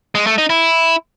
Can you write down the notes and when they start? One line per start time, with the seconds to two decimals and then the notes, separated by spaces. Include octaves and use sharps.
0.15 G#3
0.26 A3
0.38 D#4
0.50 E4